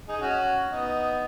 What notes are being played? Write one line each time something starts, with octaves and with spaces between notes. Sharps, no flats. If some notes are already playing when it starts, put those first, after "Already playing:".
D#4 G#4
C#4 F#4
B3 D#4